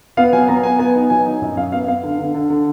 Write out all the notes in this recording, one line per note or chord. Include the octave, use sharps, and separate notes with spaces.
B3 F5
F#3 G#5
B3 A#5
B3 G#5
B3 G#5
D#4
F#3 G#5
D#4
F#2
F#2 F5
B3 F5
B3 F5
D3
D3
D3
D3